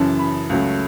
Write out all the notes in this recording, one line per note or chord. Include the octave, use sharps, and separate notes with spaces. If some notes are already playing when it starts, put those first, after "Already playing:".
Already playing: F#2 C#3 E3 A5
B5
C#2 C#3 F#3 A3